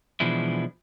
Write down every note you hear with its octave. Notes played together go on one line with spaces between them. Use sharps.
B2 E3 F3 G#3 D4 E4